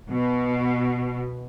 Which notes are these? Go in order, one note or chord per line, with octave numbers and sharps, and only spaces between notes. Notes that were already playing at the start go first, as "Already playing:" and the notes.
B2